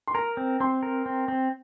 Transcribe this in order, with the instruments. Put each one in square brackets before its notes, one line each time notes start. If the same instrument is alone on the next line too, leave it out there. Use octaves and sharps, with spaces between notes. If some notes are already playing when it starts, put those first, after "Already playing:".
[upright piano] C6
[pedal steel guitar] A#4 [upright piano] A#5
[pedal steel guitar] C4
[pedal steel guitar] C4 [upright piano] C6
[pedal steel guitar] A#4
C4
C4